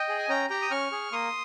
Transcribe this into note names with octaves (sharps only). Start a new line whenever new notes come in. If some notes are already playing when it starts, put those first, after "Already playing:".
Already playing: D#5 G5
G#4
G#5
C#4 G5 A#5
G4 G5 A#5
D#6
C#4 C#6 F6
G#4
A#3 C6 D#6